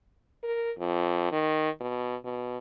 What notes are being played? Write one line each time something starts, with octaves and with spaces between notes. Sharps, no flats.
A#4
F2
D#3
B2
B2